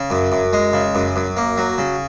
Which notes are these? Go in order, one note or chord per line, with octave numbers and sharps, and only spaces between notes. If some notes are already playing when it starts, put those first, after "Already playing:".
Already playing: C#3
F#2
F#2
G#3
C#3
F#2
F#2
A#3
F#3
C#3